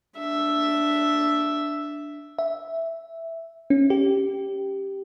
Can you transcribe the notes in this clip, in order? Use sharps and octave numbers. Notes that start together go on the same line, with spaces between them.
D4 E5
E5
C#4
G4